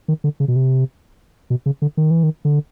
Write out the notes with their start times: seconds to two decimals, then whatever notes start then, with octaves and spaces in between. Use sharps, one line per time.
0.08 D#3
0.24 D3
0.40 C#3
0.48 B2
0.56 C3
1.50 B2
1.66 C#3
1.82 D3
1.97 D#3
2.11 E3
2.23 D#3
2.45 D3